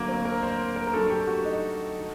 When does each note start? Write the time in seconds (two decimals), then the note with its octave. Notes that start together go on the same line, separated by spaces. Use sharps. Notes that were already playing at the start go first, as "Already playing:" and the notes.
Already playing: D2 D3 F#3 A#3
0.08 C4
0.25 A#4
0.43 C5
0.76 A#4
0.87 A#4
0.94 G2 F#3 A3 A4
1.10 G4
1.27 F#4
1.45 D#4
1.98 D#3 A3